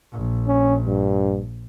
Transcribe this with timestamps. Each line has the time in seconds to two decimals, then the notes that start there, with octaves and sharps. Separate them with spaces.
0.13 A#1
0.48 C#4
0.87 G2